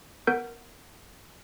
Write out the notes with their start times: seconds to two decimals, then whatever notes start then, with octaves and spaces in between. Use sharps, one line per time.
0.27 B3 A#4 F#5 G6 D7